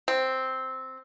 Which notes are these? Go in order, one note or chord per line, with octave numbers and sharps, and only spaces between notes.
C4